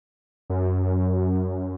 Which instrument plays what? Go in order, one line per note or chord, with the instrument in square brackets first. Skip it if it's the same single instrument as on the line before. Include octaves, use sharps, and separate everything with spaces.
[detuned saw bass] F#2